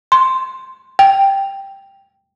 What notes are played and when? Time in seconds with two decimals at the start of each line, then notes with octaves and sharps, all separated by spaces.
0.12 C6
0.99 G5